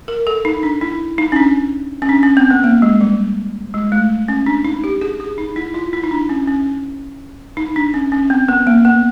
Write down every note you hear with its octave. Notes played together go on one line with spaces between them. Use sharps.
A#4
A4
D#4
D4
E4
D#4
C#4
D4
C#4
D4
C#4
C4
B3
A#3
G#3
G3
G#3
A3
C#4
D4
D#4
G4
G#4
G#4
D#4
E4
F4
E4
D#4
D4
C#4
C#4
D#4
D4
C#4
C#4
C4
B3
A#3
B3